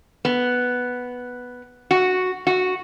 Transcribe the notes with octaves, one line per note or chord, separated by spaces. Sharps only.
B3
F#4
F#4